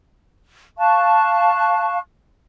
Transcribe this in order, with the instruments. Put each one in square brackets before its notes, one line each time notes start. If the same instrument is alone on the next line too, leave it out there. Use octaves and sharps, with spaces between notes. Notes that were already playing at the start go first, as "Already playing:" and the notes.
[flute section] F5 A5 C#6 F#6